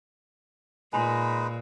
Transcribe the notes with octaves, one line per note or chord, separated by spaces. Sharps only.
A#2 G#3 D#4 B4 G#5 B5 C6